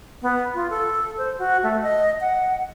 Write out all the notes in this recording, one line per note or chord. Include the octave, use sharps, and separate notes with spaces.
B3
F4
A4
C5
F#4
A3
D#5
F#5